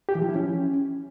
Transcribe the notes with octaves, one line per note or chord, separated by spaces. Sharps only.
G4
E3
F3
E4
C#4